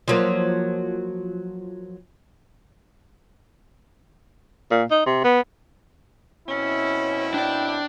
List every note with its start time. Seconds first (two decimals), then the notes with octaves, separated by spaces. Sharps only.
0.08 F3 F#3 A#3
4.71 A#2
4.91 D#4
5.06 C3
5.24 B3
6.48 B2 C4 C#4 E4
7.34 D4 D5 G5